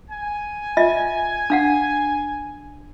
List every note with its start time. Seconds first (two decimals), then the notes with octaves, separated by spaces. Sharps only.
0.10 G#5
0.77 F4 D#5 E5
1.50 D4 F5 F#5